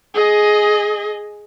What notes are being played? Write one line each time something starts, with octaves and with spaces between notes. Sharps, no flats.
G#4 D#5